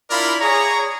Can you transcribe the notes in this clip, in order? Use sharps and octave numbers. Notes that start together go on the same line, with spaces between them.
D4 E4 F4 A#4 D5 B5
G#4 C#5 A#5